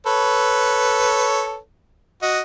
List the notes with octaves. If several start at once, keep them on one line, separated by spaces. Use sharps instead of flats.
A4 B4 C#5
F#4 D#5